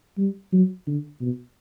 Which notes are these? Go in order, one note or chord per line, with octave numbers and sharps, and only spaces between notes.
G3
F#3
D3
B2